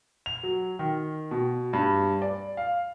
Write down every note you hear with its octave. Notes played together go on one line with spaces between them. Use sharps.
F7
F#3
D#3
B2
G2
D5
F5